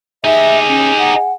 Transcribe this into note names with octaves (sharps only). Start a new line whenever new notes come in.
D#4 G4 G#4 E5
C#4
F#5